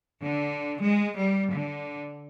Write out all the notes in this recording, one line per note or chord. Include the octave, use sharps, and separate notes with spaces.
D3
G#3
G3
D3